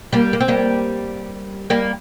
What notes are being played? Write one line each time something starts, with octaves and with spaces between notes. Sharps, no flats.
G3 A#3
A#3
C4
G3 A#3
G3 A#3